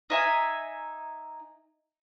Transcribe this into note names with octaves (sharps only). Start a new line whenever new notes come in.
D#4 E5 G#5